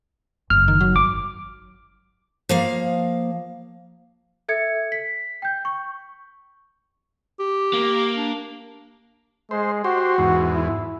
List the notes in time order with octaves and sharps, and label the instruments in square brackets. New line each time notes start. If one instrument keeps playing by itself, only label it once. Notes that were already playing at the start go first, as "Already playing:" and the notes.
[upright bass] F#1 [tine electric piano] F6
[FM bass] D#3
F#3
[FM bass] G#1 [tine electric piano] D6
[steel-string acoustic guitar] F3 A#3 F5
[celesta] A4 E5 G#6 C#7
B6
G5 G6
C#6
[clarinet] G4
[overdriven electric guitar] A#3
[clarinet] D4
[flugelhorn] G#3 [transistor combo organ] C5
[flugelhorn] F#4 [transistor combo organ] G4 C5
[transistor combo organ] E2 G#2
[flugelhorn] E4